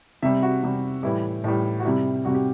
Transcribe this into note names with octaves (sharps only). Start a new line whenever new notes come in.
C3 G3 E5
F#4
C3 G3
A2 E3 G3 E4
A2 E3 G3
F#4
C3 G3 E4
C3 G3 F#4
G4